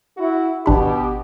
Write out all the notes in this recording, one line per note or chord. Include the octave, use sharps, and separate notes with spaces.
E4 F#4
G#1 B2 D4 G4 B5